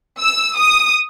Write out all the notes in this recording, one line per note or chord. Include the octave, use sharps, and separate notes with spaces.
E6
D#6